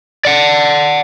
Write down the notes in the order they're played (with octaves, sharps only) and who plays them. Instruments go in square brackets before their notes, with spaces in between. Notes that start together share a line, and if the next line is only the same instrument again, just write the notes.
[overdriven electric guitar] D5 F#5